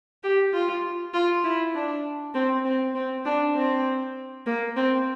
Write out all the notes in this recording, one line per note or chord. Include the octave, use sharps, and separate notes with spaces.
G4
F4
F4
E4
D4
C4
C4
C4
D4
C4
A#3
C4